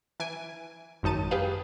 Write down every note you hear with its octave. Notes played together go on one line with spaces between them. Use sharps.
E3 G#5 D7
G#1 F#2 D#4 A5 D#7
G4 G#4 B4 F5